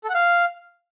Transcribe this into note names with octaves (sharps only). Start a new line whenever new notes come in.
A4
F#5
F5